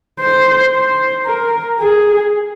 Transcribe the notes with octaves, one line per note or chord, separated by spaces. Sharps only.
C5
C5
A#4
G#4